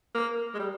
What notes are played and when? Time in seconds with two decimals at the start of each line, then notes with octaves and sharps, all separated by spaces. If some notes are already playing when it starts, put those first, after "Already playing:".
0.15 A#3
0.54 G#3
0.59 G3